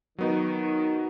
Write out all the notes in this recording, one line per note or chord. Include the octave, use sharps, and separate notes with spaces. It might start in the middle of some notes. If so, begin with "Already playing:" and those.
D#3 F#3 B3 D#4